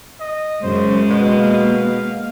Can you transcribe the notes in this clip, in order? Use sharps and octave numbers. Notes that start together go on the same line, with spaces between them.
D#5
F#2 C#3 G#3 C5
B2 A#3 F#4
F5